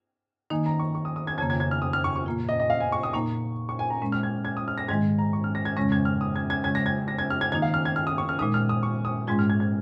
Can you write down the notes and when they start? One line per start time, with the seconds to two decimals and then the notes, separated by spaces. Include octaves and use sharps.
0.50 D#3 A#3 D#4 G#5
0.66 A#5
0.79 C#6
0.95 C#6
1.05 D#6
1.16 D#6
1.27 G#6
1.38 F2 C#3 A#3 G#6
1.50 G#6
1.60 G#6
1.71 F6
1.82 D#6
1.93 F6
2.04 C#6
2.16 C#6
2.26 A#2 A#3 F4
2.49 D#5
2.60 D#5
2.70 F5
2.80 G#5
2.92 C#6
3.03 D#6
3.13 A#2 A#3 D#4 C#6
3.69 C#6
3.79 G#5
3.90 A#5
4.01 A#2 G#3 C#4
4.12 F6
4.23 G#6
4.45 G#6
4.57 D#6
4.68 F6
4.78 A#6
4.88 G#2 D#3 G#3 G#6
5.19 A#5
5.33 C#6
5.44 F6
5.55 A#6
5.65 G#6
5.77 F2 C#3 G#3 C#4 A#6
5.92 G#6
6.05 F6
6.21 D#6
6.36 G#6
6.50 G#6
6.64 C#3 G#3 C#4 G#6
6.75 A#6
6.86 G#6
7.08 A#6
7.18 G#6
7.30 F6
7.41 G#6
7.52 D#3 A#3 D#4 G#6
7.62 F5
7.74 F6
7.85 G#6
7.96 F6
8.07 D#6
8.18 C#6
8.29 F6
8.39 A#2 G#3 D#4 D#6
8.54 F6
8.69 D#6
8.83 C#6
9.05 D#6
9.27 G#2 G#3 C#4 F4 G#6
9.39 F6
9.50 G#6
9.60 G#6